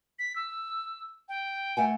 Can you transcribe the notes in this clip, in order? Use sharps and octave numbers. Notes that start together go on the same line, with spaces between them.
B6
E6
G5
A3 F#5 G#5